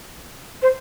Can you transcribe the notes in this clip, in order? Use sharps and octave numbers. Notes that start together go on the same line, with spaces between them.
C5